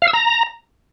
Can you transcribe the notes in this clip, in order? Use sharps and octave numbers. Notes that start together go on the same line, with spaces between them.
F5
E6
A#5